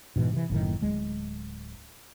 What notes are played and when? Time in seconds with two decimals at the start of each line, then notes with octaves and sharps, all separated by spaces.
0.16 G#2 B2 E3
0.33 C3 E3
0.50 F#1 A2 D#3
0.81 D1 G#3